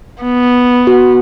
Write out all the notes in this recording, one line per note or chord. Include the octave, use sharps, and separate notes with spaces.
B3
F#4